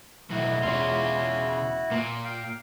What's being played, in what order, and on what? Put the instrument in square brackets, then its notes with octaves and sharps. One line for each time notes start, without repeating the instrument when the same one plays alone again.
[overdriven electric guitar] B1 A2 [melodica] E4 F#4
[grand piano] E1 C#4 [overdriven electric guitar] C#3 F4
[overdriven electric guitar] A#2 [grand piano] A#3
[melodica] F5 G5